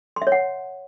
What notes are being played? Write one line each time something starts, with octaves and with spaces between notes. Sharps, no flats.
C6
E5
C#5
F#5